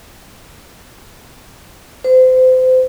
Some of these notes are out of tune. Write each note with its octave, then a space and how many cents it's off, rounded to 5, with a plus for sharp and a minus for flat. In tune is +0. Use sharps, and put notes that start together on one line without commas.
C5 -30